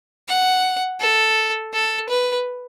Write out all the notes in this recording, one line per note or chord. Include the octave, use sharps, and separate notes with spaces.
F#5
A4
A4
B4